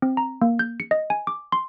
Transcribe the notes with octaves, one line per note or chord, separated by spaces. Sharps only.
C4
A#5
A#3
G6
C#7
D#5
G#5
D6
C6